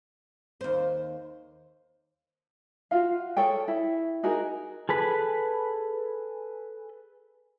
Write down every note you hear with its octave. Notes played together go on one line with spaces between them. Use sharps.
D#2 C5
F4 F#4 F5
G#4 A4 C#5 G5
E4
D#4 F#4 G#4 A#4
G#4 A4 B4 B5